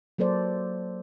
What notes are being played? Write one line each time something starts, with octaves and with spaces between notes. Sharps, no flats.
F#3 A#3 A4 C5 D5